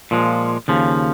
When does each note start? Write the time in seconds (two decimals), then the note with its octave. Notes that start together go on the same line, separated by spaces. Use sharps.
0.11 A#2 F3 G#3
0.68 D#2 C#3 F3